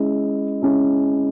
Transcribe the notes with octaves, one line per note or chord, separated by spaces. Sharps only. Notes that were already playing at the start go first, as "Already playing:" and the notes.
Already playing: G#3 C#4 E4
G#3 C#4 E4